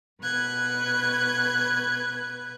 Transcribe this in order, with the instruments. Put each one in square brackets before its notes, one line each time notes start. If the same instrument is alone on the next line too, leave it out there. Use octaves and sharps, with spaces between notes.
[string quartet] B2 B4 F#6 G#6